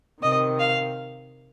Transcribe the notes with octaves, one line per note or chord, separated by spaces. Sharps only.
C3 D#3 D#5
F5